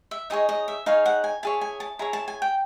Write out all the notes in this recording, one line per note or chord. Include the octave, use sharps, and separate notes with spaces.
E5
D#4 G#4 C#5 D#5
D#5
E5
D#4 G#4 C#5 F5
F#5
G#5
E4 G#4 C#5 A5
G#5
A5
E4 G#4 C#5 A#5
A5
G#5
G5